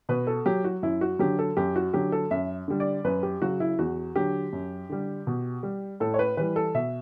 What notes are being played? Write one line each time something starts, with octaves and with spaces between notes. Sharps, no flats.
B2 B4
A4
F#3 G4
F#4
F#2 E4
F#4
D3 F#3 G4
A4
F#2 G4
F#4
D3 F#3 G4
A4
F#2 E5
D3 G3
D5
F#2 B4
G4
C#3 F#3 F#4
E4
E2 F#4
D3 F#3 G4
F#2
D3 G3
B2
G3
A2 A4
C#5
B4
E3 G3 B4
A4
B2 E5